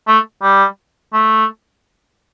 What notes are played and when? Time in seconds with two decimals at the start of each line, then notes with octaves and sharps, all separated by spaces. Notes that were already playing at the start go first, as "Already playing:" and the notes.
0.08 A3
0.43 G3
1.13 A3